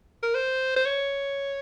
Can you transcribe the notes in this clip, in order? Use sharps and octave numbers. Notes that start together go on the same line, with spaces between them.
A#4
C5
C5
C#5